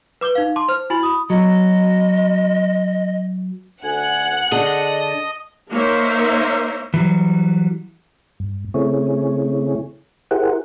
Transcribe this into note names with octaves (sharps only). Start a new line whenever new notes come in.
B4 D6 G6 G7
D#4 F5
A5 C6 D6
C5 F6
E4 F#4 G#5 B5 A6 F#7
B5 D#6
F#3 D#5
D2 F#5 G#5 F#6
D3 G#4 D#5 A5
A#3 D#4 A#4 C5 C#5 E5
E3 F#3 G3
G2
C#3 A3 C4 E4 G#4 C#5
E4 G4 G#4 A#4 C5 F#5